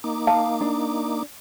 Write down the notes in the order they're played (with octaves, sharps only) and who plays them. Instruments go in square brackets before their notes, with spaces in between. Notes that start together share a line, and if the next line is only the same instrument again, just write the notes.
[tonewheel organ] A#3 D#4 D6
[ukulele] F5 [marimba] A5
[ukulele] D4